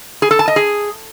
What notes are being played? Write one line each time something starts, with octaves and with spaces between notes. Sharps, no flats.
G#4
A4
A5
D#5
G#4